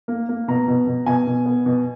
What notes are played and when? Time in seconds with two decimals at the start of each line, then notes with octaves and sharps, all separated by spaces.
0.08 A#3
0.29 A#3
0.48 B2 A#5
0.68 B2
0.87 B2
1.06 B2 G#5
1.27 B2
1.46 B3
1.66 B2